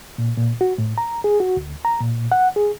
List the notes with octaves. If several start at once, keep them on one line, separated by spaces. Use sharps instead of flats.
A#2
A#2
F#4
A2
A#5
G#4
F#4
D2
A#5
A#2
F#5
G#4